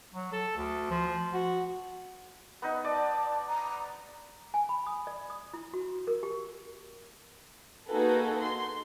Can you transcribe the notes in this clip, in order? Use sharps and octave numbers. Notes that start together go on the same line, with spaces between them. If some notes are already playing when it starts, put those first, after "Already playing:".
F#3
A4
D2
F3
F#4
B3 D#4
D5 A5
A#5
G#5
B5
D#6
D5
D#6
E4
F#4
A#4
G4
A#3 D#4 F#4 G#4 A4 B4
C6